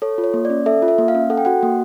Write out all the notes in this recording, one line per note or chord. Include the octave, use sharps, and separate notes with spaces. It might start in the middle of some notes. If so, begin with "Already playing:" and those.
A4 C#5
F4
C#5
A#3
D5
C#4
A4 E5
F4
E5
A#3
F5
C#4
A4 F#5
G5
F#4 F#5
A#3